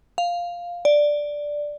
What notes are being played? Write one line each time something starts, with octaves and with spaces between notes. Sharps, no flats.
F5
D5